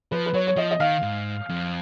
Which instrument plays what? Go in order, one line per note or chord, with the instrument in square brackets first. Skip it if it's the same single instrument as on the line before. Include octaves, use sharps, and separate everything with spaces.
[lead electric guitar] F3 [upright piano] B4
[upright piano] B4
[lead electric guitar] F#3 [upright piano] C#5
[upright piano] C#5
[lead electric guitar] F3 [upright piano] D#5
[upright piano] D#5
[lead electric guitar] D#3 [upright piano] F5
[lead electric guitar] G#2
F2